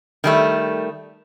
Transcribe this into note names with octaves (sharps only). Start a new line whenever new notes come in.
D#3 G3 A3